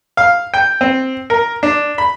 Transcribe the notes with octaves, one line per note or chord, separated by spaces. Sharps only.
F5
G5
C4
A#4
D4
B5